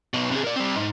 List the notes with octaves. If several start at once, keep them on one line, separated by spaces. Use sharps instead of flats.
B1 B2
C3 G#4
A#4 D5
G3 C4
G#2